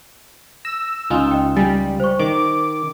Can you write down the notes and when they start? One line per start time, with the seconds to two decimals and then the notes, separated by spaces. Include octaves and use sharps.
0.65 E6 A#6
1.10 C#2 D#4 F4 G#5
1.31 D#5 G5
1.56 G3 G#5 A6
2.00 C5 C#6
2.20 D#3 D6